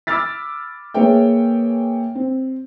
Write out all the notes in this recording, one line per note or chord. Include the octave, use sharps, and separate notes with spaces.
B5 D6 E6 F6 A6 B6
A#3 G#4 B4 C#5 E5 G5
C4